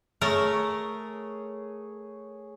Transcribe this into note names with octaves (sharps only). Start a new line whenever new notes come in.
A3 G#4 A#4 C#5 C#6